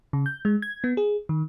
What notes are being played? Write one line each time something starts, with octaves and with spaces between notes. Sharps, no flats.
C#3
G6
G#3
G#6
B3
G#4
D#3